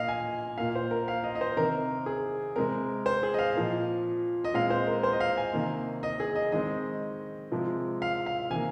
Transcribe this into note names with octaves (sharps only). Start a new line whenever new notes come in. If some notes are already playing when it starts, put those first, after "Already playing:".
Already playing: A#2 A#3 D#5 F5
G#5
A#2 A#3 F5
C5
A#4
F5
D#5
D#5
C5
C3 D#3 C4 A#4
G#4
C3 G#3 C4 A#4
C5
G#4
D#5
F5
A#2 F3 A#3
D#5
A#2 G#3 C4 F5
C5
A#4
C5
D#5
F5
G#5
C3 D#3 A#3
D#5
G#4
D#5
D#3 G#3 C4 D#5
C3 F3 G#3
F5
F5
C3 D#3 A#3 G#5